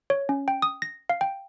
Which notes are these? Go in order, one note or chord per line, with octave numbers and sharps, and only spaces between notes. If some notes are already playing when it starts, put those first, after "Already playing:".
C#5
C#4
G5
D#6
A#6
F5
G5